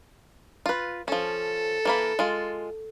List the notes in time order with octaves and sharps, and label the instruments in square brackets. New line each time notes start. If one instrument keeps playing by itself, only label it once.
[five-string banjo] F4 B4
[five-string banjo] F3 C#4 [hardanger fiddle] A4
[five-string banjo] E3 A#3 B5
G#3 F4